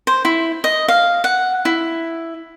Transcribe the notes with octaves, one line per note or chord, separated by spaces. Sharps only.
C5
E4
D#5
F5
F#5
E4